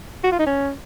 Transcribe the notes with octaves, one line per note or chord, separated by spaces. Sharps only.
F#4
F4
D#4
C#4